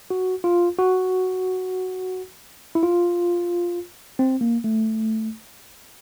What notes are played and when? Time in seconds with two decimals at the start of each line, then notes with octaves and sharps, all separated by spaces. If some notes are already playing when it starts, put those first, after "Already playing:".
0.10 F#4
0.44 F4
0.79 F#4
2.75 E4
2.83 F4
4.19 C4
4.41 A#3
4.64 A3